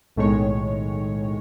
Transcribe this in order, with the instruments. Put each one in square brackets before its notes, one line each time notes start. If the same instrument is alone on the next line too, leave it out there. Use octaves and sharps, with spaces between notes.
[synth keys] B1 A2 D#3 G#3 C#5